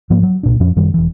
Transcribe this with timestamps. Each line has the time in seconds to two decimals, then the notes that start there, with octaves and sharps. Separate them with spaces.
0.10 G#2 F3 A#3
0.23 F#3
0.43 C2 A#2 D4
0.60 F2 F3 C#4
0.76 F#2 D#3 G3
0.94 E1 E3